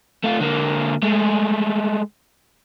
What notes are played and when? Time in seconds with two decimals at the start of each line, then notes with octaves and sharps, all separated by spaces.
0.24 A3 F4
0.40 D3 A#3
1.03 G#3 A3